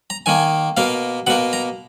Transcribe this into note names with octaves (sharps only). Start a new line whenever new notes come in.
A#5
D#3 A#3 G#5
B2 A#3 F5
B2 A#3 F#5
A#5